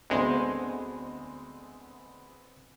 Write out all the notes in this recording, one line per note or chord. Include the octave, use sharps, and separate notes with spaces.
D2 G#3 B3 C4